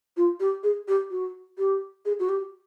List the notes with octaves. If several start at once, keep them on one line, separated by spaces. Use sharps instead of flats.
F4
G4
G#4
G4
F#4
G4
G#4
F#4
G4